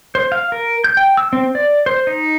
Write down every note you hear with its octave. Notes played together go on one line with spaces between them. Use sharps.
C5
F5
A#4
G6
G5
E6
C4
D5
C5
D#4